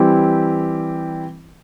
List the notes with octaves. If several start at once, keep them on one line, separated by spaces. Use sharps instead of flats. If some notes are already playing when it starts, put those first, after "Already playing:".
Already playing: E3 G3 C4 E4 G4